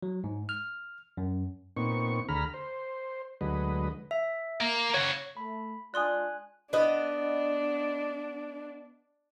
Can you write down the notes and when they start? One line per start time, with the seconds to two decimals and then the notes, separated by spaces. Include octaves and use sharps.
0.03 F#3
0.24 G#2
0.49 F6
1.17 F#2
1.77 A#2 B3 C4 D#4 C#6
2.29 D2 G#4 A#5 B5 F6
2.54 C5
3.41 D2 F#3 G#3 B4 D#5
4.11 E5
4.60 A#3
4.94 C#3 F#4 C#5
5.37 A3 B5
5.94 G#3 D4 F4 D5 G#5 C6 D#6 F#6
6.73 B3 D4 D#5